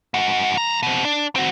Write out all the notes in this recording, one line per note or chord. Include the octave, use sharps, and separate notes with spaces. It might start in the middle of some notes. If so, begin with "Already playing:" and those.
G#2 F#4
F2 A#5
B2 C4
D4
C4 F#4